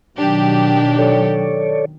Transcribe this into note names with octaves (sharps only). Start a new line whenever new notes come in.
B2 D#3 F#3 D4 G4
A4 C#5 D5